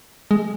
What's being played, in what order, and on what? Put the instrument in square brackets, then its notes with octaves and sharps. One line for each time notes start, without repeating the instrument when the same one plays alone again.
[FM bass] G#3